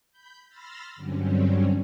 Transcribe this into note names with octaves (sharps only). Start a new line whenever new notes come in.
B5 G6
B5 C6 E6 F6 A6 A#6
G2 D3 F#3 G3 C4 C#4